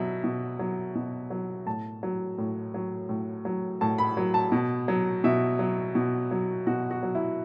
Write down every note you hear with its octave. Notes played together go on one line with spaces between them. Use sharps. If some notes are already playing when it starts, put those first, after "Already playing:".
Already playing: B2 F#3 E5
B2
F#3
B2
F#3
A2 A5
F#3
A2
F#3
A2
F#3
A2 A5
B5
F#3
A5
B2
F#3
B2 E5
F#3
B2
F#3
B2 F#4
F#4
F#3
E4